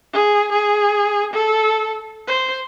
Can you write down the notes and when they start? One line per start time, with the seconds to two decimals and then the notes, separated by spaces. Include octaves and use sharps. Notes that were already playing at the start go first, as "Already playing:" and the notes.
0.13 G#4
0.52 G#4
1.33 A4
2.27 C5